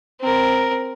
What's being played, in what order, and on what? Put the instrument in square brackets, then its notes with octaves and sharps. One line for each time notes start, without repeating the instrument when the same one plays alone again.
[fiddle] C4 A#4